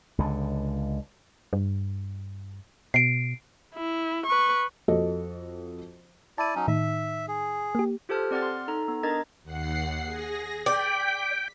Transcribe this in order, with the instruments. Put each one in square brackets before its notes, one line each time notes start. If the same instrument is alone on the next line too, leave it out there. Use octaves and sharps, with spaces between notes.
[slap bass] C#2 D3
[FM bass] G2
[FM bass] B2 [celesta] C7 D7
[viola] E4
B4 C#6
[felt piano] F2 F#4 A4 D#5
[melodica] E4 D5 [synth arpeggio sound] A5 D#7
[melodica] F#3 C#4 D#4
[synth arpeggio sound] A2 D#3 D#4 [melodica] E5
[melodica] G#4
[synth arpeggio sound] A#3 G4
[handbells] F4 G4 A4 C5 A5 F6
C4 D5 F#5 F6 A6
C6
D#4 A4 A#5
B3
D4 A#4 D#5 A#5 G#6 A6
[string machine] D#2 F#5 C7
G#4 A#6
[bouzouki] D5 [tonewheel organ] G5 [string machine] B6